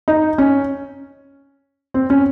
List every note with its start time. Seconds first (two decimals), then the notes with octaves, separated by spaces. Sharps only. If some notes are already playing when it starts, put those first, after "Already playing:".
0.08 D#4
0.38 C#4
1.94 C4
2.10 C#4